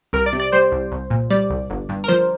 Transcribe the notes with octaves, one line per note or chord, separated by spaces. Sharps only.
C2 A#4
D5
C3
D5
G3 C5
C2
C2
A#2
G3 D5
C2
G1
G2
A#4
F3 C5